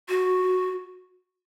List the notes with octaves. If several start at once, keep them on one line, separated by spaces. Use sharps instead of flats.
F#4